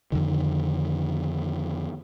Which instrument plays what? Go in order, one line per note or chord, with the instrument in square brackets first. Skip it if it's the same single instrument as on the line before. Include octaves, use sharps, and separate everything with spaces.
[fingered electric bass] F2 D3 D#3